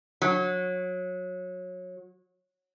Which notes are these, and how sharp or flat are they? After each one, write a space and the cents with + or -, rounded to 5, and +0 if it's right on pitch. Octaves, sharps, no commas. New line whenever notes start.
F#3 -25